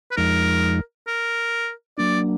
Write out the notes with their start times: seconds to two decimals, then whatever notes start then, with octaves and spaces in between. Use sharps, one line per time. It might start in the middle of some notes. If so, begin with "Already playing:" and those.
0.11 B4
0.17 F2 F3 G#3 D#4 A#4
1.07 A#4
1.98 F#3 A#3 D4 D5